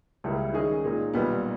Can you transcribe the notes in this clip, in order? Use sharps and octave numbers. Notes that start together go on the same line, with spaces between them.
C#2 C#3 G3 A#3 E4
D#3 G#3 C#4 G#4 D#5
A#2 G#3 D#4
B1 A#2 G3 B3